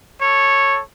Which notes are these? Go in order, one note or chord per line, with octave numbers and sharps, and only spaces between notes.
A4 C#5